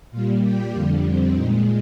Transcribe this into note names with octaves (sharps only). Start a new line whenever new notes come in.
A#2 G3 F4
G4
F2 D3 G3 F4
C4
A#2 G#3 D#4